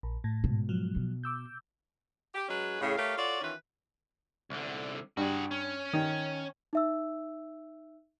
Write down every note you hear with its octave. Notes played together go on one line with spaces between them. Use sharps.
A#1
A2
G#2 B2
F3 F#3
B2
D6 E6 G6
G4
F#3 G#3 C#4 G#4 B4
A2 C#3
A3 G4 A#4 C#5 F5
F4 F#4 A4 C#5 D5
D#3 E3 C#4 F4 B4
C2 D3
G2 F#4 G#4
C#4
D#3
D#4 E5 E6